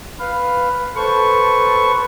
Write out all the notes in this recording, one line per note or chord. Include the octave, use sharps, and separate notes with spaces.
B4 F5
A4 B4 C5 C#6